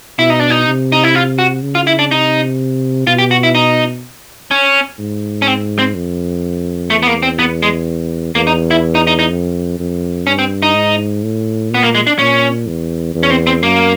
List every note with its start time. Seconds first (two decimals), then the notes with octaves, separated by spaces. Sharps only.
0.19 B2 E4
0.30 D#4
0.40 D4
0.50 D#4
0.67 C3
0.92 D#4
1.03 E4
1.15 F4
1.39 F#4
1.63 C#3
1.75 F4
1.87 E4
1.99 D4
2.10 C3 D#4
3.07 B2 F4
3.18 G4
3.31 F#4
3.43 E4
3.55 D#4
4.51 C#4
4.99 G#2
5.42 C#4
5.47 C4
5.79 C4
5.95 F2
6.90 E2 A3
7.03 B3
7.07 A#3
7.23 C4
7.39 B3
7.63 G#3
8.35 E2 A#3
8.47 D#4
8.71 E4
8.95 D#4
9.07 D#4
9.19 D#4
9.30 F2
9.79 F2
10.27 G2 C#4
10.39 C4
10.62 D#4
10.75 G#2
11.23 A2
11.71 A#2 B3
11.83 A#3
11.95 G#3
12.07 D4
12.19 A#2 C#4
12.67 E2
13.15 E2
13.23 C#4
13.30 C4
13.47 C4
13.63 F#2 A#3